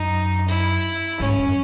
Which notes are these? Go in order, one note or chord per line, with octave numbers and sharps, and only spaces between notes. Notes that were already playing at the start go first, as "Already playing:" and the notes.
Already playing: F#2 D#4
E4
G#2 C#4
F#2